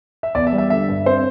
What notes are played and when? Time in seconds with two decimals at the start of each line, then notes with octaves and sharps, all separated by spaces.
0.23 E5
0.35 E2 D5
0.47 E5
0.53 G3
0.58 E5
0.70 D3 E5
0.89 G2
1.06 C4 C5